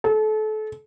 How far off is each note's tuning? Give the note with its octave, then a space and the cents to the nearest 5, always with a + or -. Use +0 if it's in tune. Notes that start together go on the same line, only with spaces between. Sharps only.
A4 -30